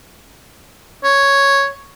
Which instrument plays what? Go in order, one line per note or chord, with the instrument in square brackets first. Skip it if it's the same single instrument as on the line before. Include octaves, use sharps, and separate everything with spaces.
[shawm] C#5